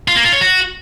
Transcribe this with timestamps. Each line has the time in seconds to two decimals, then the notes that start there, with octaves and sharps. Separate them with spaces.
0.08 F4
0.16 A#3
0.24 F4
0.33 C#5
0.41 F#4